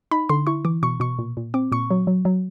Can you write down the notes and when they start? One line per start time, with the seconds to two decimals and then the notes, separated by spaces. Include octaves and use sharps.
0.11 D#4 B5
0.29 D3 C6
0.47 E4 C#6
0.65 E3 D6
0.83 B2 C#6
1.00 B2 C#6
1.19 A#2
1.37 A#2
1.54 C4 D6
1.72 A#2 C#6
1.91 F#3
2.07 F#3
2.25 F#3